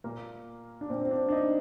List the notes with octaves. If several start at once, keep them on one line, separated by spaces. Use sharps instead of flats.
A#2 A#3
D4
A#2 C4
C4
D4
D4
D#4